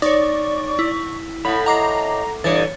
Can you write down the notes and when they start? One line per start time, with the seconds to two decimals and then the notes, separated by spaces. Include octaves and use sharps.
0.02 D#4 C#5 D5 C#6
0.79 E4
1.45 A2 F#5 B5
1.66 D#5 F#5 A#5 D6 C7
2.44 G2 E3 A4 C#5 A6